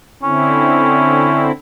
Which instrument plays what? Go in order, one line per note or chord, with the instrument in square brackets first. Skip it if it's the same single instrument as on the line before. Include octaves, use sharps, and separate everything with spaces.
[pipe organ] D3 C4 E4 [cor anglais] C#4